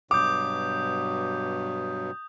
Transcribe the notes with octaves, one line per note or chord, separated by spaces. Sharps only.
G2 B2 F#3 D6 D#6 G6